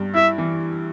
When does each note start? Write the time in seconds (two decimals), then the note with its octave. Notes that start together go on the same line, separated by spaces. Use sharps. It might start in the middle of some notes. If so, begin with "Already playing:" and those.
Already playing: G2
0.14 E4 E5
0.38 E3